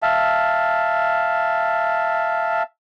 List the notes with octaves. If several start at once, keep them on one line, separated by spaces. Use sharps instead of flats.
E5 F5 A5